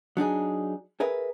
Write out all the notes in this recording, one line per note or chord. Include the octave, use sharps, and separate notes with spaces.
F#3 D4 D#4 G#4
G#4 A#4 B4 E5